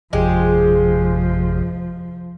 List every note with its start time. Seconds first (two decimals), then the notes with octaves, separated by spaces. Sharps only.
0.13 G#1 F2 C3 F3 G#3 G4